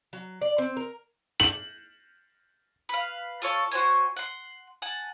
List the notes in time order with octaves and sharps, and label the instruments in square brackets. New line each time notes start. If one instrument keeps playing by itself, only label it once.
[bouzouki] F#3
D5
C4
A#4
[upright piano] F#7
[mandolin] B4 F5
F4 A4 C#5 A5
F#4 C5 C#5 G#5
F#5 C6
F#5 G#5 A5